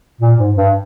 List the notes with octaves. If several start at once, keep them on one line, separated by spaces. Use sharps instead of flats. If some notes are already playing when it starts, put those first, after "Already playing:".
A#2
G#2
G2